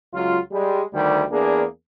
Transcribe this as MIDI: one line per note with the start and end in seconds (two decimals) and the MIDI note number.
0.14 0.38 37
0.14 0.38 54
0.14 0.38 65
0.51 0.83 55
0.51 0.83 56
0.93 1.23 38
0.93 1.23 51
0.93 1.23 55
1.31 1.64 40
1.31 1.64 58
1.31 1.64 62
1.31 1.64 68